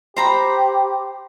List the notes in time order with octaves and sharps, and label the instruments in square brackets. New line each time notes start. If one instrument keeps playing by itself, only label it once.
[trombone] G4 [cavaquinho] C5 A#5 B5